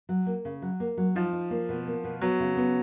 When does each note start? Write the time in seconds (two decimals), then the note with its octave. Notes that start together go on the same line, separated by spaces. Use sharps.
0.09 F#3
0.26 A#3
0.45 C#3
0.62 F#3
0.80 A#3
0.97 F#3
1.15 F3 D#4
1.33 D#4
1.50 A#3
1.69 B2
1.87 A#3
2.04 B2
2.21 F#3 B3
2.40 C#3
2.57 B3